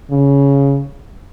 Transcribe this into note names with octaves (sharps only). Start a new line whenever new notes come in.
C#3